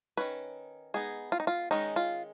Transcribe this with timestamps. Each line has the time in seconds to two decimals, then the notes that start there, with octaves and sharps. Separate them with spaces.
0.17 D#3 F#3 C#4 B4
0.94 G#3 B3 D#4 G#4
1.32 F4
1.40 D#4
1.47 F4
1.71 D#3 G#3 C#4 D#4
1.96 F4